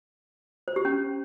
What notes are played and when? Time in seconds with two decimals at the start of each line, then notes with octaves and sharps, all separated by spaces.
0.68 C5
0.76 G4
0.85 C#4